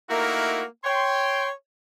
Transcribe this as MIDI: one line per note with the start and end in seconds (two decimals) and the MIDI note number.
0.10 0.63 57
0.10 0.63 58
0.10 0.63 63
0.10 0.63 64
0.10 0.63 66
0.10 0.63 70
0.84 1.49 73
0.84 1.49 79
0.84 1.49 84